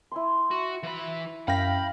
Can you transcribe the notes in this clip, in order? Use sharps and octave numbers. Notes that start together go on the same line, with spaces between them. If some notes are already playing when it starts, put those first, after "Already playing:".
E4 G#5 C6
F#4
E3 B5
F#2 F5 G5 B5 A#6